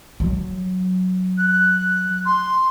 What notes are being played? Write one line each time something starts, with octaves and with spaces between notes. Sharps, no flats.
F#3
F#6
C6